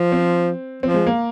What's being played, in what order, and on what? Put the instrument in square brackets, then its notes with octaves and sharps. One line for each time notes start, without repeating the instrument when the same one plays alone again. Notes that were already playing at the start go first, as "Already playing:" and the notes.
Already playing: [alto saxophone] F3
[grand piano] C4
[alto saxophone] F3 [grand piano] C4
[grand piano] G#3
A#3